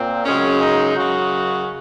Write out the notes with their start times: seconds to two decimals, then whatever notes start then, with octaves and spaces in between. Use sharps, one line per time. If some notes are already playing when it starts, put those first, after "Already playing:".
Already playing: A#2 C4
0.25 F#2 C#3 G#3 C#4
0.61 D#4
0.96 F#2 C#3 F#3 F#4